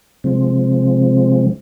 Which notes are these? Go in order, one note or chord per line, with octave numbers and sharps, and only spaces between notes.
C3 F3 G#3 C4